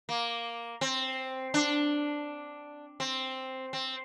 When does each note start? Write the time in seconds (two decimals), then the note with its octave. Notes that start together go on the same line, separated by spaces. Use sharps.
0.09 A#3
0.81 C4
1.54 D4
3.00 C4
3.73 C4